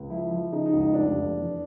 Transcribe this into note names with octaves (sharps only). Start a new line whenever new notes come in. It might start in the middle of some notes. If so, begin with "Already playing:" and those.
Already playing: C#2
F3 E4
F3
C#3 D#4
D#4
C#2
D#4
F1 D4
F1
E2